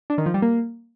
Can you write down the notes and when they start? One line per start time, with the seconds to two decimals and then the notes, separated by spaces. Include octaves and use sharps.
0.10 D4
0.18 D#3
0.26 F3
0.34 G3
0.42 A#3